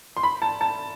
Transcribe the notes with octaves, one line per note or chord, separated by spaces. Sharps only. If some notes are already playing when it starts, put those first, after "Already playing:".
C6
B5
A5
A5